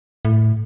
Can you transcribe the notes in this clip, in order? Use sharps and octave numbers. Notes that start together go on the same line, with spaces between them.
A2